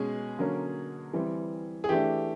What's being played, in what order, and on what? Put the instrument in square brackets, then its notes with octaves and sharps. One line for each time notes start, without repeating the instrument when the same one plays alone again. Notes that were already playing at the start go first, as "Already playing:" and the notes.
Already playing: [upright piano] B2 G#3 C#4 G#4
D3 F#3 A#3 C#4
E3 G3 C4
G#4
E3 A3 D4 G4